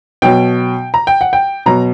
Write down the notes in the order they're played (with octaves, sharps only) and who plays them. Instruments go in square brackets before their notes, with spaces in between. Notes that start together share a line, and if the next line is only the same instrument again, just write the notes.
[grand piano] B2 F#3 G5
A#5
G5
F#5
G5
B2 F#3 A#5